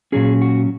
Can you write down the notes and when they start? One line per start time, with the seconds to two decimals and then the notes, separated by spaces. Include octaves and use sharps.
0.12 A#2 F#3 C#4 G#4
0.42 F#4